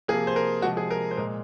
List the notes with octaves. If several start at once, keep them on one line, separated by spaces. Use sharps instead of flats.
C3 F3 A#3 G#4
C5
A#4
C3 F3 G#3 F#4
G#4
A#4
C5
A#2 G#3 A#4